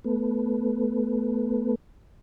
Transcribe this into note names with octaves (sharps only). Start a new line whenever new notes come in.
A3 B3